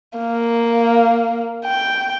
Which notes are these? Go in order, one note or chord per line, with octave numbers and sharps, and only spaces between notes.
A#3
G5